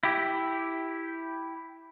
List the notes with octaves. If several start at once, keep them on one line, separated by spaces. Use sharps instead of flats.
E4 G4